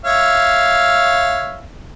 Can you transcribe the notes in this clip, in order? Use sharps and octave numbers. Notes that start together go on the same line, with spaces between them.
C#5 E5 F5